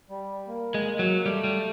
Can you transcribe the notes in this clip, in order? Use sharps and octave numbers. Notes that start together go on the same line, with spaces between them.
G3
A#3
G#3
F#3
G3 A3
G3